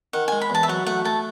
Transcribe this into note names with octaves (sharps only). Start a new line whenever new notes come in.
D#3 F#5
G#3 G#5
B5
E2 A5
E5
F#3 F#5
A3 F#5
A3 A5